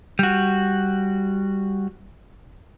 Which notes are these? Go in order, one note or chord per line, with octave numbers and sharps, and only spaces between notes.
G3 F#4